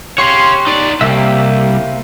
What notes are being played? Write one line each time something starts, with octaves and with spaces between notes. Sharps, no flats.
F#4 G4 C#5 F5 C6
D#4 D5
C2 A#3 G4 E5